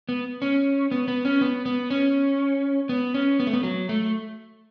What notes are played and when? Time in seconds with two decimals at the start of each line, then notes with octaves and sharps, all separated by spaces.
0.09 B3
0.42 C#4
0.92 B3
1.08 B3
1.25 C#4
1.41 B3
1.66 B3
1.90 C#4
2.89 B3
3.14 C#4
3.40 B3
3.47 A3
3.53 B3
3.63 F#3
3.89 A3